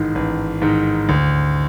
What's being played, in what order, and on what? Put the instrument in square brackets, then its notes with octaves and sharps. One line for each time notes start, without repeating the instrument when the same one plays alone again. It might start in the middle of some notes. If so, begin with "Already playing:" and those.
Already playing: [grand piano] A1 G#2 D#3
A1
G#2 D#3
D2